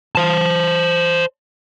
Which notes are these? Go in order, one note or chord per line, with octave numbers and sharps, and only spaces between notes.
C5 A5